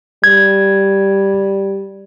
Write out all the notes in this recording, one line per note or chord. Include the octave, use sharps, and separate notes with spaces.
G3 G#6